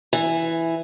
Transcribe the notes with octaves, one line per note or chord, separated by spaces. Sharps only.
E3